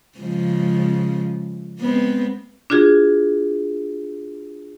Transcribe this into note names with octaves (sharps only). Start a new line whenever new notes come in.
C#3 F3 G#3
G#3 B3 C4
D4 F4 F#4 G#4